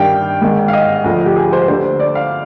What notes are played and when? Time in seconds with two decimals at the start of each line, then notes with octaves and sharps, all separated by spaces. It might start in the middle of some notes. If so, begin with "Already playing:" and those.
Already playing: G2 D#3 G3 D4 F5 G5
0.41 G#1 G#2 D#3 G#3
0.68 F5
0.73 D#5
1.04 D2 D3 F3
1.26 G4
1.36 G#4
1.53 C5
1.68 D2 D3 G3 D4 C5
2.00 D5
2.15 F5